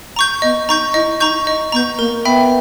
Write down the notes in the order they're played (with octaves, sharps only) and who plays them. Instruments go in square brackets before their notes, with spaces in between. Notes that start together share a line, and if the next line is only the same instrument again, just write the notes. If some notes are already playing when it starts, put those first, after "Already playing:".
[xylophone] A#5 C#6 G6
[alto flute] B3 [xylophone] D#5
[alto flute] D#4 [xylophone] A#5 C#6 G6
[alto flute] E4 [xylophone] D#5
[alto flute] D#4 [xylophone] A#5 C#6 G6
[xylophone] D#5
[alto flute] B3 [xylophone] A#5 C#6 G6
[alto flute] A#3 [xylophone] A#4
[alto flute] B3 [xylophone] E5 G5 B5